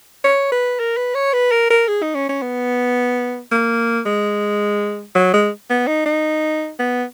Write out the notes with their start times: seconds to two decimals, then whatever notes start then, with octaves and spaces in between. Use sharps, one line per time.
0.24 C#5
0.52 B4
0.79 A#4
0.97 B4
1.15 C#5
1.33 B4
1.51 A#4
1.70 A#4
1.88 G#4
2.02 D#4
2.15 C#4
2.29 C#4
2.42 B3
3.51 A#3
4.06 G#3
5.15 F#3
5.33 G#3
5.70 B3
5.87 D#4
6.06 D#4
6.79 B3